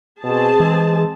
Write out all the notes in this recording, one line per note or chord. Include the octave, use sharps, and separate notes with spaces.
B2 C4 G#4 A5
E3 G#3